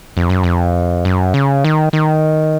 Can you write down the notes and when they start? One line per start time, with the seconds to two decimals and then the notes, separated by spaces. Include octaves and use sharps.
0.17 F2
0.30 F#2
0.44 F2
1.05 F#2
1.34 C#3
1.65 D#3
1.93 D#3